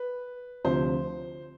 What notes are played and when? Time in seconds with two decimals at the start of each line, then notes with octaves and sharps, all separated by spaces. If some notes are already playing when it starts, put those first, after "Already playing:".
Already playing: B4
0.65 D2 C3 F3 C5